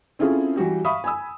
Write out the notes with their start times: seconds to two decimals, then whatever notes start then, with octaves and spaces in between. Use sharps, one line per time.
0.19 C4 C#4 E4 F4 G#4 A4
0.56 E3 G3 F#4 G4
0.84 E5 F5 B5 C#6 D#6
1.04 G#5 B5 D#6 E6